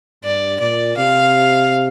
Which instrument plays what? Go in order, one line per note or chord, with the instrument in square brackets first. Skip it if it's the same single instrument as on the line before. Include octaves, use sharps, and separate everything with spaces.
[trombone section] G2 [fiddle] D5
[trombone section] A#2 [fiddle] D5
[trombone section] C3 [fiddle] F5